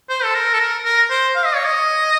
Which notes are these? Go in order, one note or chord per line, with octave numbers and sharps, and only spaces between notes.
C5
A4
A#4
A4
A#4
A#4
C5
F5
D#5
C#5
D#5